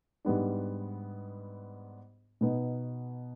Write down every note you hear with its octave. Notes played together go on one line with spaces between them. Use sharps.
G#2 G3 B3 D4
B2 B3 D#4